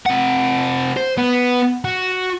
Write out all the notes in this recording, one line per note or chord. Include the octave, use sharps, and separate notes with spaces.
C3 F#5
C5
B3
F#4